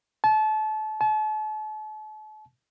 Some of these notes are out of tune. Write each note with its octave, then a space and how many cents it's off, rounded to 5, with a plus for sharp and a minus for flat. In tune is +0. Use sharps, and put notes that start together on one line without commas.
A5 -30
A5 -40